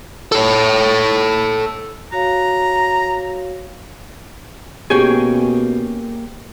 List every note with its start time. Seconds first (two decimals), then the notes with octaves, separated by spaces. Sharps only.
0.32 A4 C#5
2.12 F#4 C#5 F5 A#5
4.90 B2 A#3 C#4 G4 G#4 C#5 G5 G#5